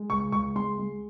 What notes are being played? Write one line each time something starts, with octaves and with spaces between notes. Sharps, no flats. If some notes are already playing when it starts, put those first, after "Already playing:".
Already playing: G#3
C#2 C#6
C#2 C#6
G#3 C6
G#3